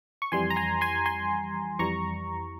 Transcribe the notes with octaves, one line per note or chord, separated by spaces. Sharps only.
C#6
F2 E3 G3 G#5 C6
A#5
G#5 C6
G#5 C6
G#5 C6
F2 E3 G3 A#5 C#6